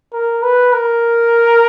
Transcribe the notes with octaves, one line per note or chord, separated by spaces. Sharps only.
A#4
B4
A#4